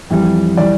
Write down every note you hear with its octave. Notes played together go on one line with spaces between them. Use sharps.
F2 E3 G3
E3 G3 D5